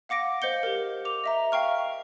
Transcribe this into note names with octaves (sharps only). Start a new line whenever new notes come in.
F5 F#5 D6 A#6 D7
C5 D#5 F5 G6 C#7 G7
G4 A#4
D6 F7
D#5 E5 A#5
F5 G5 C#6 F6